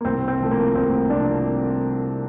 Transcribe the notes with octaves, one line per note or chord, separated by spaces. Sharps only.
A#3
C2 C4
C4
C3 F3 A3
A#3
C2 C4
C3 F3 A3 D4